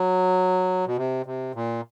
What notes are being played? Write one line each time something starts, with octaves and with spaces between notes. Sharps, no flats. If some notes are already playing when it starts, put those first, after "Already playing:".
Already playing: F#3
B2
C3
C3
A#2